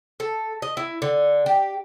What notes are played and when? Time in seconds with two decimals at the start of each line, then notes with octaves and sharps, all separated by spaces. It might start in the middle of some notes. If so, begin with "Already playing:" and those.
0.20 A4
0.62 D#5
0.77 E4
1.02 D3
1.46 G4